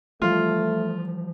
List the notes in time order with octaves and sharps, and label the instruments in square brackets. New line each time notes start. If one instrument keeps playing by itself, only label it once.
[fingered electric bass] E3 F3 G3 [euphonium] A3 [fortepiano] F4